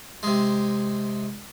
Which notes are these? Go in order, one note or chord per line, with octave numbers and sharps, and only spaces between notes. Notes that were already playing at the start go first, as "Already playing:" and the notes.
C3 G#3